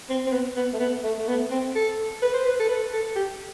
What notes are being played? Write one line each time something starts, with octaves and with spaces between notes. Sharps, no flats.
C4
C4
B3
B3
A3
B3
A3
A3
B3
C4
A4
B4
C5
B4
A4
B4
A4
G4